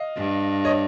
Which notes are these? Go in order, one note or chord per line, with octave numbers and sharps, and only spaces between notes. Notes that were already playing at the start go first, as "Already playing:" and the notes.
Already playing: D#5 F5
G2
C#5 D#5